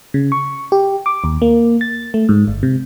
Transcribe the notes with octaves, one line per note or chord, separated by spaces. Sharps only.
C#3
C#6
G4
D6
D#2
A#3
A6
A3
G#2
G1
C3